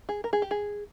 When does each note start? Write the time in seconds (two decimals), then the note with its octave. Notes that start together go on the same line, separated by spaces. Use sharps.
0.09 G#4
0.24 A#4
0.33 G#4
0.42 G4
0.51 G#4